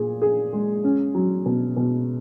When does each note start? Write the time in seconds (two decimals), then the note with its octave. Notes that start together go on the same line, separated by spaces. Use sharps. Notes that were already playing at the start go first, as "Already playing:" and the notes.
Already playing: A#2 G#4
0.22 G#4
0.53 G#3
0.84 C#4
1.15 F#3
1.46 B2
1.77 B2